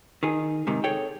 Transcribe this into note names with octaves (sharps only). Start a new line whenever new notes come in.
D#3 G#4
G#2 C3 D#3
G#4 A4 C#5 G5